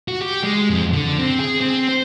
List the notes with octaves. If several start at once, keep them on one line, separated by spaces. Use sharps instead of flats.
F#4
G4
G#3
F2
D3
C4
G#4
C4
C5